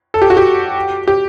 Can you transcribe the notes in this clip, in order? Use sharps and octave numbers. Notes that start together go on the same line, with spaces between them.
A4
G4
F#4
G4
G4